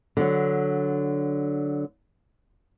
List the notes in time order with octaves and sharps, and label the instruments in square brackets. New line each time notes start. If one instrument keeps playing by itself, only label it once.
[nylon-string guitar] D3 F#3